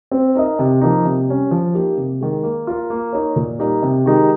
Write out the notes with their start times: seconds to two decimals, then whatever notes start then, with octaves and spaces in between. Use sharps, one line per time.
0.11 C4
0.36 D#4 A#4 D#5
0.59 C3
0.82 F3 A#3 D#4
1.05 C3
1.28 G3 C#4
1.51 F3
1.74 A#3 D#4 G4
1.97 C3
2.20 D#3 G#3
2.43 A#3
2.67 F4 A#4
2.90 A#3
3.13 D#4 A#4 C#5
3.36 A#2
3.59 G3 A#3 D#4 A#4
3.83 C3
4.06 D#3 G#3 D#4 G4